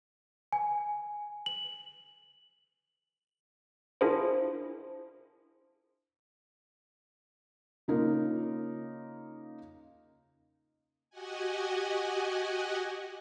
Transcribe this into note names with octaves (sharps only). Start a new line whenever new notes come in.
G#5
F#7
D4 E4 F4 G#4 A#4 C5
C#3 A#3 D#4 F4 A#4
F#4 G4 D#5 F#5 G#5